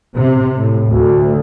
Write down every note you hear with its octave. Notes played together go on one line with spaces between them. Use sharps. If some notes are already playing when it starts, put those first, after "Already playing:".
C3
A2
D2